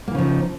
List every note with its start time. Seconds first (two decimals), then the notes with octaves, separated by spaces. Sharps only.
0.08 A#3
0.11 E3
0.15 C#3
0.18 F3
0.22 D#4